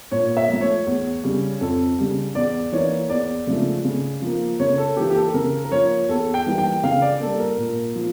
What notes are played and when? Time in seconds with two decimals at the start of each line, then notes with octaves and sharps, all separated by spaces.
0.12 A#2 C#5
0.37 E5
0.49 F3 A3
0.61 C#5
0.86 E2
1.23 C#3 G3
1.61 F2 A4
1.98 C#3 G3
2.35 E2 D5
2.72 E3 A#3 C#5
3.10 E2 D5
3.47 C#3 F3 A3
3.85 C#3
4.22 F3 A#3
4.60 C#3 C#5
4.78 A4
4.97 E3 A#3 G4
5.10 G4
5.15 A4
5.34 C#3 A#4
5.64 A#4
5.72 F3 A#3 C#5
6.09 E2 A4
6.34 G5
6.46 E3 G3 A#3
6.58 G5
6.83 C#3 F5
7.02 D5
7.20 G3 A#3 A4
7.40 A#4
7.58 A#2
7.96 F3